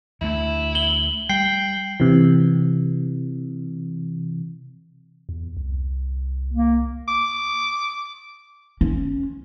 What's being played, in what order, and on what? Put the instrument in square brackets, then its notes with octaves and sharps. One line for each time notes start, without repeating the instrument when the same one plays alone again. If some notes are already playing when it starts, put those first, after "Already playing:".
[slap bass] D2 A3 [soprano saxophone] E4
[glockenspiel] F#7 G7
[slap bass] G3 [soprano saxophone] G5 [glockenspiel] C7
[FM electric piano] C3 E3
[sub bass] E2
C2
[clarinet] A#3
[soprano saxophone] D6
[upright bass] C#4